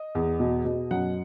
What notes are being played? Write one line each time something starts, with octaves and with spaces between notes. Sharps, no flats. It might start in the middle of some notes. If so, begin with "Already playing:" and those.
Already playing: D#5
E2
B2
B2
F#2 F#5